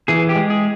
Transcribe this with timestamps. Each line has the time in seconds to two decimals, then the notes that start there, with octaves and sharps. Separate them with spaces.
0.08 E3 G#4
0.29 G4
0.36 G#3
0.50 G#4